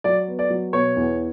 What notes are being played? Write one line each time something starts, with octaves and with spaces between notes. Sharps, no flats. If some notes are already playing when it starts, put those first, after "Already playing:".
F#3 D5
B3
D5
F#3
B2 C#5
E2